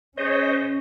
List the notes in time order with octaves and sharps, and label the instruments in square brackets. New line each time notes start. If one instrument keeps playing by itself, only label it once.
[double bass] C#4 [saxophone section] G#4 C#5 [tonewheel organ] C5 D#5